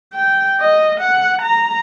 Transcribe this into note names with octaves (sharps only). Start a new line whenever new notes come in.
G5
D#5
F#5
A#5